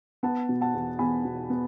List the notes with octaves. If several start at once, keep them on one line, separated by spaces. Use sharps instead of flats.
B3 F#5 A5
B2
F#5 A5
E2
E2 G#5 B5
B2
B3